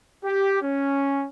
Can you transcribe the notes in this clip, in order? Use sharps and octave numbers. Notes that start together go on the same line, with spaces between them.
G4
C#4